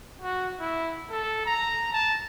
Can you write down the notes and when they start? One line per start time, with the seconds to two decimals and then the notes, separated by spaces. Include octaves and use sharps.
0.21 F#4
0.60 E4
1.10 A4
1.46 A#5
1.93 A5